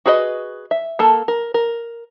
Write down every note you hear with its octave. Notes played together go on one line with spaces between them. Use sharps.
F#4 G#4 B4 C#5 D#5
E5
A#3 A4 A5
A#4
A#4